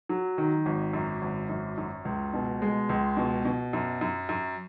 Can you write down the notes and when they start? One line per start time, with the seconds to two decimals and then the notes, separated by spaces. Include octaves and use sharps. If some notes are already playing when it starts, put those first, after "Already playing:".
0.09 F#3
0.38 D#3
0.66 G#1
0.93 F#2
1.22 G#1
1.49 F#2
1.78 F#2
2.05 C#2
2.34 B2
2.62 G#3
2.89 C#2
3.17 B2
3.45 B2
3.73 F#2
4.01 F#2
4.29 F#2